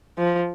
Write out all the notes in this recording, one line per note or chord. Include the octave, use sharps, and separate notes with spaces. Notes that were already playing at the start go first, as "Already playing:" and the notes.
F3